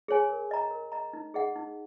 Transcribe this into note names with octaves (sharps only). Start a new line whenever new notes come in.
G#4 C#5 G#5
A#4
D#5 A#5
A#4
D#5 A#5
D#4
G#4 D#5 F#5
D#4